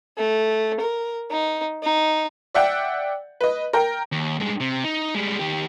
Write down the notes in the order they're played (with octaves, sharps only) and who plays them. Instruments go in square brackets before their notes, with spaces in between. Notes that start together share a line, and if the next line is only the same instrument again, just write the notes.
[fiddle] A3
A#4
D#4
D#4
[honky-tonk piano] D5 E5 F#5 G5
B4 D#5
A#4 G5
[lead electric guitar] D#2
G2 G#3
C3
D#4
G3 G#3
D#3 G4